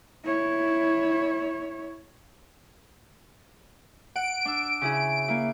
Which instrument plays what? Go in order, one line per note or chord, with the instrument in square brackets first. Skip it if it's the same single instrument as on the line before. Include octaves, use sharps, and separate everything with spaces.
[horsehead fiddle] E4 C#5
[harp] F#5 [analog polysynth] D7
[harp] D4 E6
C#3 E4 G#4
A#3 E4